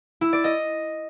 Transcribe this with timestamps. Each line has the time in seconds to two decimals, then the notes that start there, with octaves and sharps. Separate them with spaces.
0.21 E4
0.33 D5
0.44 D#5